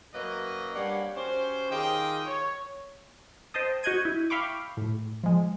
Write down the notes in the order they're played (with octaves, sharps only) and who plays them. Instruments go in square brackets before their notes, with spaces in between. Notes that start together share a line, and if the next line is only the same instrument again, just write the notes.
[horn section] F#2 F#3 A#3 B4 D#5
G3 A#3 D4 G4 C#5 F#5
C#4 F#4 G4 C5
D#3 F4 G4 G#4 D#5 G5
C#5
[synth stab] C5 D#5 G5 A5 D#6
F#4 D#5 F#5 G6 G#6 D#7
E4
E5 F5 G5 B5 C#6 D6
A2
F3 G#3